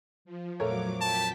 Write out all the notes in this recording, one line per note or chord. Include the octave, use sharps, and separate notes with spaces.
F3
F2 A#2 F#3 A3 A#4 C#5 D6
G5 A5 B6